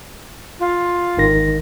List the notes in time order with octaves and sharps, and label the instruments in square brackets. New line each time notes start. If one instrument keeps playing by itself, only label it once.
[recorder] F4
[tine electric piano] G#1 D#3 A#6